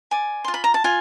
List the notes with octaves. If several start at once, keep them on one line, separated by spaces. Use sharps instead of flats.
D5 G#5
F4 C6
B5
A#5
A5
F4 G#5